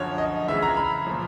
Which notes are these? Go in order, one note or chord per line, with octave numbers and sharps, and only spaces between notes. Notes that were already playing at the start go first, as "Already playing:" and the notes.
Already playing: F#2 D3 F3 C#5
D#5
F2 C#3 E3 E5
A#5
B5
A#2 F3